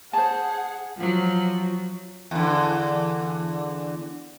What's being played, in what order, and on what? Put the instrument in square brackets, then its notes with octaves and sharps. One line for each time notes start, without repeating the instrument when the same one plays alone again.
[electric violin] G#4 [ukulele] C5 A5 [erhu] F#5
[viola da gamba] F3 F#3
[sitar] E2 D3